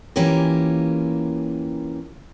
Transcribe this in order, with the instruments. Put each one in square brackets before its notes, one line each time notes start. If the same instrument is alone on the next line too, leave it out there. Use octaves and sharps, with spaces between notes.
[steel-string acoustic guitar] E3 A#3 C#4 F4 G4 A#4